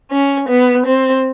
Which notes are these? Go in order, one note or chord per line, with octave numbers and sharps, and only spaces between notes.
C#4
B3
C4